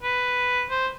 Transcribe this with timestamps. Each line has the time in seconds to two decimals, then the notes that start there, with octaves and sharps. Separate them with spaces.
0.03 B4
0.70 C5